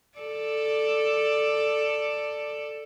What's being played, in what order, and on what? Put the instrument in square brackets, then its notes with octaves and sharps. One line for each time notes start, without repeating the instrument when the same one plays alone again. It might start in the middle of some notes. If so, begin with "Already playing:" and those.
[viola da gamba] A4 D5